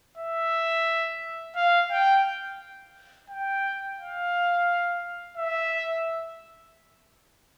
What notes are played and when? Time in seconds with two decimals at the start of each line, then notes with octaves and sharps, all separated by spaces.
0.18 E5
1.56 F5
1.91 G5
3.29 G5
3.99 F5
5.37 E5